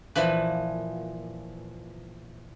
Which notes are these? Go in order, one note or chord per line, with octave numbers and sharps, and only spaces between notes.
A#2 E3 F3 B4